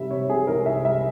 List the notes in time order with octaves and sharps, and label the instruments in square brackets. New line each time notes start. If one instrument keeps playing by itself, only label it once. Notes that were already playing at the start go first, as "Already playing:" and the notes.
Already playing: [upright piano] C3 G3 E5
C3 C#5
C3 G#4
C2 A#4
C2 E5
G3 E5